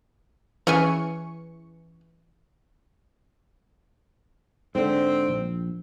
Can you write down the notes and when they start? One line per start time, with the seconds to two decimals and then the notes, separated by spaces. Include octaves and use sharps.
0.67 E3 C#4 G#4 G#5 C#6 C#7
4.75 G#2 D3 C4
5.28 A#1